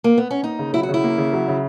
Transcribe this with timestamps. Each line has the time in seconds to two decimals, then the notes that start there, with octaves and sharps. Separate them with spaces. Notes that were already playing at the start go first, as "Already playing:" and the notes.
0.04 A#3
0.18 B3
0.31 C#4
0.43 A#3 D#4
0.59 C#3
0.73 F#3 E4
0.83 F#4
0.89 C#3 E4
1.04 A#3
1.18 C#3
1.33 F#3
1.48 C#3